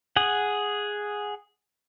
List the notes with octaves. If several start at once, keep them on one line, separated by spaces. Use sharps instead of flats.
G#4 F#5